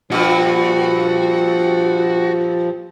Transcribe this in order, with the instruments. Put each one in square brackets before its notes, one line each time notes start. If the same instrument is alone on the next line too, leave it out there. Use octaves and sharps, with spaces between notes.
[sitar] G2 A#2 [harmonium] F3 [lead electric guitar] F#4